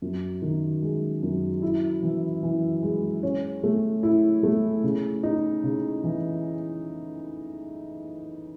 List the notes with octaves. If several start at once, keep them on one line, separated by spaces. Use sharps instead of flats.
F#2
D#3
G#3
F#2
E4
E3
E3
G#3
C#4
A3
E4
A3
C#3
D#4
C#3
E3